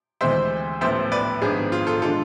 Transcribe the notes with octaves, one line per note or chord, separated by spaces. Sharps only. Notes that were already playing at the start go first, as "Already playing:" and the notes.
D2 C3 E3 G#3 C4 C5 E5
A1 A2 F3 B3 C5 E5
B4 D5
G#1 G#2 F3 B3 D4 G#4
F4
F4 A4
D3 G#3 D4 F4 A4